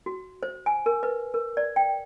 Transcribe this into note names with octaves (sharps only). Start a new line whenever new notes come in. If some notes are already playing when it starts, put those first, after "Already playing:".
F#4
C5
G#5
A#4
B4
A#4
D5
G5